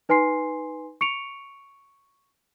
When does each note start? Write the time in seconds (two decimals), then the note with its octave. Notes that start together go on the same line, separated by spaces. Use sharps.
0.09 D#4 B4 G#5 C6 C7
1.01 C#6 C#7 D7 F7